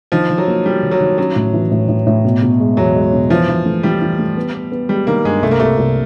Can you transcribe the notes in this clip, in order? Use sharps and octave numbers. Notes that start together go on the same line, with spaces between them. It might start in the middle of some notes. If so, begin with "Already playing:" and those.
D#3 F3
D#3
F#3
A#3
G3 A#3
D#3
F#3
D#3
F#3 C#4
A2
E3
A2
A2
A2
B2
B2
G#3
E2 F#3
G#3
B2
E3 F3
E3
A3
E3 G3
E3
A3
B3
B3
B3
G3 G#3
D#3 A#3
G2 G#3
C2 A3
A#3
C2 A3
C2